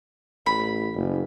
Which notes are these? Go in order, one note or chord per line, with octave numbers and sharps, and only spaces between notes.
A1 B5
F#1